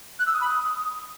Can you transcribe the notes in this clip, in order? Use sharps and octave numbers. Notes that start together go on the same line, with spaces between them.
F#6
E6
D#6
B5
D#6